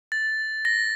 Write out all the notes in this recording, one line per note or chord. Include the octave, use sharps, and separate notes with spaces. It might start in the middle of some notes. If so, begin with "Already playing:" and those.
A6
A#6